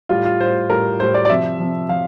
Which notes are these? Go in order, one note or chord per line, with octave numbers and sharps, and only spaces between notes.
A2 G3 F4
F4
A2 G3 C5
A2 G3 A#4
A2 G3 C5
D5
D5
C3 F3 E5
C3 F3
F3 F5